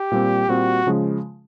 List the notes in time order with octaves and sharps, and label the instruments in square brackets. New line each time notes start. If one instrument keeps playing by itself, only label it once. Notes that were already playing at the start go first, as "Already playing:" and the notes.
Already playing: [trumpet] G4
[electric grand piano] A#2 G3 C4
[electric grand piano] A#2 G3 C4 [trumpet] F#4
[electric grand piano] C#3 F3 G#3